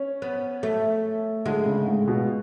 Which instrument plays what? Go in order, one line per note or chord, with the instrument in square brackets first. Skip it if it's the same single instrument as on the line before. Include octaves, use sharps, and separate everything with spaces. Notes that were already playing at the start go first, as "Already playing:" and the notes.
Already playing: [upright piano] C#4
[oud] B3
A3
[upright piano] D3 [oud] G#3
[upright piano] C#3
G#2
A2
B2